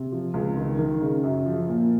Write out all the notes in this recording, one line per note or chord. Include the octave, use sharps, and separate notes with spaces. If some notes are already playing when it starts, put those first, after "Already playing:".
Already playing: C3
F3
C#2
D#3
D#3
C#3
F#2
F3
A#2